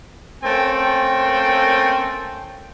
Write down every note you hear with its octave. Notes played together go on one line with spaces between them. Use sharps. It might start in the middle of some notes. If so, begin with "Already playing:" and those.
A3 A#3 C4 C#4 G5